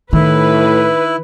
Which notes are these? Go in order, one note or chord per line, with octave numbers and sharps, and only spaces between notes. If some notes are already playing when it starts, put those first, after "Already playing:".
A2 D#3 E4 B4